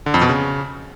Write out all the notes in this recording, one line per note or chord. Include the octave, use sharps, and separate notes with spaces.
D3
F2
B2
C#3